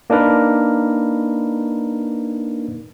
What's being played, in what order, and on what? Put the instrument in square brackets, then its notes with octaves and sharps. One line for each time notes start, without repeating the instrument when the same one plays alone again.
[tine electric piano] A#3 D4 D#4 A#4 B4